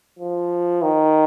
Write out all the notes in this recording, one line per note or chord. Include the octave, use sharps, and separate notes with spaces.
F3
D#3